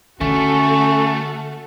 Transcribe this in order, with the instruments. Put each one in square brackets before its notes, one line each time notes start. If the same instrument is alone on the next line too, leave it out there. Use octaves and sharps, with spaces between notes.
[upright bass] D3 [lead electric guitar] A3 [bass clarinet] C#4 [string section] F#4 A4